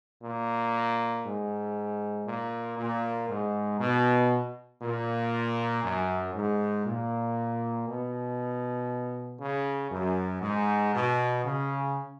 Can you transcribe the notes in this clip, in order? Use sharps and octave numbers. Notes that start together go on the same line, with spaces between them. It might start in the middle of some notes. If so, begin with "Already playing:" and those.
A#2
G#2
A#2
A#2
G#2
B2
A#2
F#2
G#2
A#2
B2
C#3
F#2
G#2
B2
C#3